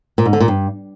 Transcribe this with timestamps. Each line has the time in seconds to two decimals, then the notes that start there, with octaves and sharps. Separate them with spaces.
0.18 A#2
0.25 G#2
0.33 D3
0.40 A#2
0.48 G2